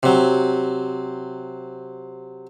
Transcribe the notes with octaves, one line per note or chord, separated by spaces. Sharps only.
C3 F#3